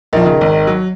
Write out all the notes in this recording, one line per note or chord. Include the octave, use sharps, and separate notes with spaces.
A#1 D#3 F3
C#3
G#1
F#3